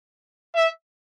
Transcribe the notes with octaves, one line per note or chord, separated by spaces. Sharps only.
E5